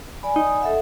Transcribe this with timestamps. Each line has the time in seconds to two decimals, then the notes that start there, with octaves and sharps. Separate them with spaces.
0.23 D5 G#5 B5
0.36 D#4
0.61 A4 E5 F#5